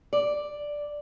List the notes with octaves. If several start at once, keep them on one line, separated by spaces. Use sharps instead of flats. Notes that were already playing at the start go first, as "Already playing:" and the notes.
D5